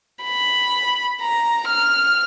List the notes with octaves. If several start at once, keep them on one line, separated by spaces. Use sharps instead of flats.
B5
A#5
F6